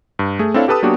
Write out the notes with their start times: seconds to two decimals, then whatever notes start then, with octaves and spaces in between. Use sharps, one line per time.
0.19 G2
0.39 A3 G#4
0.54 C4 D4 E4 A4 C#5 F5
0.68 G4 A4 B4 A5 D#6
0.82 F#3 A#3 B3 D4 F#4 G4